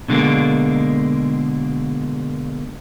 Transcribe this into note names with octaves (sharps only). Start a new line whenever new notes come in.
B2 D3 G#3 A#3